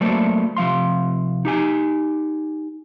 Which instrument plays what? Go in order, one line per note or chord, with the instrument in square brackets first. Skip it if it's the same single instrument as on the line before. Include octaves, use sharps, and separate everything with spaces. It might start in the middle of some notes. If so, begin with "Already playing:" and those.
[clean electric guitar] F#3 A3 A#3 A4 C5 D5
C3 F3 F5 C6
D#4 G4 G#5